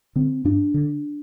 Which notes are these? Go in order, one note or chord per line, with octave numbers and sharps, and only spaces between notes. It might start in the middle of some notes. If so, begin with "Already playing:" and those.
D3 C4
G2 D4
D3